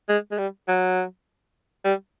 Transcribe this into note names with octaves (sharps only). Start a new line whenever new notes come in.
G#3
G#3
G3
F#3
G3